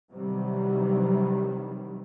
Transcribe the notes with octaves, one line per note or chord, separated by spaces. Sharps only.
C3 D#3 E3 F#3 G3